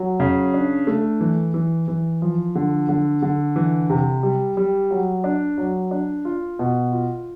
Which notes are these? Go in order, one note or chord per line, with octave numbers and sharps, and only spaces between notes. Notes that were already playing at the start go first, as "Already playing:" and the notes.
Already playing: F#3
C#3
D4
A3
E3
E3
E3
F3
D3
D3
D3
E3
C3
G3
G3
F#3
D4
F#3
D4
F4
B2
F4